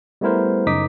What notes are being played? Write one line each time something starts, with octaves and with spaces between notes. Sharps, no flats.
G3 A3 B3 E4 A#4 C5
F#2 C#3 D#4 D6 D#6 B6